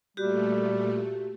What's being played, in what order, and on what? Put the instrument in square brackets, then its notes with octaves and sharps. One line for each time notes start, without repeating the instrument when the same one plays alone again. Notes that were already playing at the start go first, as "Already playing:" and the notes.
[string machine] A#2 A3 [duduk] G3 [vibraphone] F#4 G4